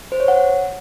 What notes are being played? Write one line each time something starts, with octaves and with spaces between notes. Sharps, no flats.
C5
C#5
F#5